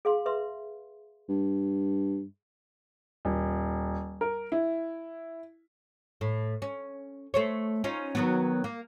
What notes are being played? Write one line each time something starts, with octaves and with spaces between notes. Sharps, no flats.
G#4 F5 C6
B4 E5 C6
G2
D#1
A#4
E4
A2
C#4
A3 C5 C#5
C#4 D#4 F4
D#3 F#3 B3
A#3